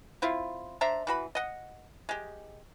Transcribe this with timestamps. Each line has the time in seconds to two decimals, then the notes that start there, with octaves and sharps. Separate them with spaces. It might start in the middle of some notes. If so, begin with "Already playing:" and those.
0.22 C4 E4 F4
0.81 D4 C5 E5 A#5
1.07 E3 F#4 B5
1.35 D#5 F#5
2.09 G#3 G4